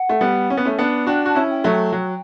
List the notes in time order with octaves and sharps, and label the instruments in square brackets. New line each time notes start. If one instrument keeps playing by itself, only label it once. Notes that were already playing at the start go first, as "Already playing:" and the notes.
Already playing: [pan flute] F#5
[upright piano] A3
G3 B3
C#4
B3
A3 C#4
B3 D4
[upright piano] D4 F#4 [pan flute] G5
[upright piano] F#4 [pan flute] A5
[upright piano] C#4 E4
[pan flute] G5
[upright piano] F#3 A3
[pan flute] G5
[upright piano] F#3